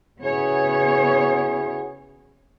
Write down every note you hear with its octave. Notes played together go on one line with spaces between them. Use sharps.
C#3 B3 E4 F#4 G#4 C#5